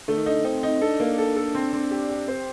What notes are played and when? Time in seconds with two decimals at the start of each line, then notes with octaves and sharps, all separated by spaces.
0.08 D3 A3
0.17 D#3
0.26 D3 D#4
0.45 C4 D#4
0.63 D#4
0.81 D4 A4
1.00 A#3
1.18 A4
1.36 A4
1.55 C4
1.73 C4
1.91 G4
2.09 G4
2.28 C4 C5